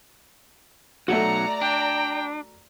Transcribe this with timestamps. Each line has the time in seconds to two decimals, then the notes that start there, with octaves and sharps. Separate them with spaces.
1.08 B1 F#3 A3 F#4 D5 A#5 C#7
1.61 D4 G5